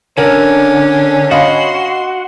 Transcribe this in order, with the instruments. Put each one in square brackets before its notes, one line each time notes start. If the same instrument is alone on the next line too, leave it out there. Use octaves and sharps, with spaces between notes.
[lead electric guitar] D3 [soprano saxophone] C#4 [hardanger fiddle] D4 [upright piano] A#4
[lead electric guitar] F#4 [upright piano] D#5 F5 B5 [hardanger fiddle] C6